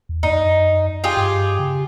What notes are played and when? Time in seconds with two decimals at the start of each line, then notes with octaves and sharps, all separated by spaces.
0.09 E2
0.23 F#2 D#4
1.04 F4 G4 G#4
1.17 G2
1.59 C#3